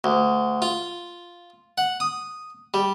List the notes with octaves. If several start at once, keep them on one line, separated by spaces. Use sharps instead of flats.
D2
F4
F#5
D#6
G3